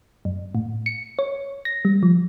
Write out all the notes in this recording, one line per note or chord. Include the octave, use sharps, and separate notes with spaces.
F#2
A2
C#7
C#5
A#6
G3
F3